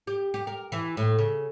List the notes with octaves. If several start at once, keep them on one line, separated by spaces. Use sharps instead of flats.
G4
G4
A#4
E3
A2
C#3